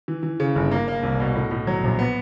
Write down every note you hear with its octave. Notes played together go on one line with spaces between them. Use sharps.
E3
E3
C#3
G1
A#3
A#3
C2
B2
A2
A2
F#3
A#1
B3